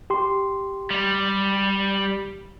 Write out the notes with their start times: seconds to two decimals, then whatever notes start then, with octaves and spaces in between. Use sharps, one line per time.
0.10 G4 C6
0.90 G3